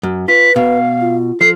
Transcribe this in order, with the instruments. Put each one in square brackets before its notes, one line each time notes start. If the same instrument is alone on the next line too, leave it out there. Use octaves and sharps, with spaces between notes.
[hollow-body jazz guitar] F#2
[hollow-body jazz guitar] F4 [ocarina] B4 [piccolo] B6
[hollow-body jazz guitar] B2 [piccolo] F5
[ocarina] F4
[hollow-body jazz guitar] F3 [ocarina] A4 [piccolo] C7